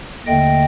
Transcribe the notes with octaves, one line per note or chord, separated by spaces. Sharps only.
D#2 D3 A3 D#5 G5